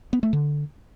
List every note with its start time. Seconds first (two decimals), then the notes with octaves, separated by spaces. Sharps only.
0.13 B3
0.23 A3
0.33 D3